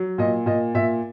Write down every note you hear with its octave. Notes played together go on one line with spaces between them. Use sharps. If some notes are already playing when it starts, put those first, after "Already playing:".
Already playing: F#3
A#2 D#5
A#2 D#5
A#2 E5